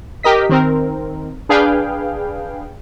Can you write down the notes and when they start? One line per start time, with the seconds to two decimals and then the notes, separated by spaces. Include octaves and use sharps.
0.23 G4 A#4 D#5 B6
0.49 D#3 C4 A#4
1.49 D4 G#4 B4 F5 G5